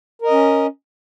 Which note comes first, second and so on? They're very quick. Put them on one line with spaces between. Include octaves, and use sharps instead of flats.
A#4 D#5 C#4